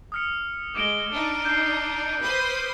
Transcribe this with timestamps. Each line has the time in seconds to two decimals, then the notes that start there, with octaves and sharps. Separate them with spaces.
0.12 D#6 F6 C#7
0.75 G#3 D6 D7 G7
1.12 D4 D#4
1.45 G6 C7
2.20 B4 C5 D#6